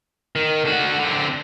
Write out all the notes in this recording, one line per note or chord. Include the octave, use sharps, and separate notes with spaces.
D#3
D3 F#4
D3 C4